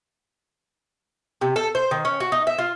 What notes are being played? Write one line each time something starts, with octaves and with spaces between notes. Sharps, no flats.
C3
A4
C5
D#3
C#4
F#4
D#4
E5
F4